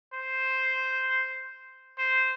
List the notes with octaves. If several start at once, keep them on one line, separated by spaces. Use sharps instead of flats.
C5
C5